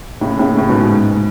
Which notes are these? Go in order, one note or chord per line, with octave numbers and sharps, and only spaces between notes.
A2 C#3
A2 C#3
A2 C#3
G#2 B2
G#2